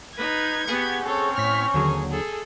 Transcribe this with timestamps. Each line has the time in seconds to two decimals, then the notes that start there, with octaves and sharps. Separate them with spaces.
0.17 D#4 B4 G#6
0.67 B3 G4 G#4 F#5 C#6
1.05 C4 C#4 A4 C#5
1.38 A2 F6 B6
1.74 D#2 D3 F#3 G#4
2.11 G#4 A4